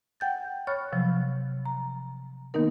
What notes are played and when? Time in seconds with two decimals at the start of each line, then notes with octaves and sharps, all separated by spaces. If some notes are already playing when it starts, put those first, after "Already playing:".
0.20 F#5 G5 G6 A6
0.67 C#5 B5 C#6 F6 F#6 A6
0.92 C3 F3 F#3
1.66 A#5
2.54 D#3 A#3 B3 D#4 A#4